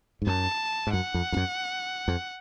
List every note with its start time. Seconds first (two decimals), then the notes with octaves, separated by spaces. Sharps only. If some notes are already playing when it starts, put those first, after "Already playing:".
0.22 G#2
0.27 F#2 A5
0.87 G#2
0.93 F#2 F#5
1.14 F2
1.32 F2
1.37 F#2
2.08 F2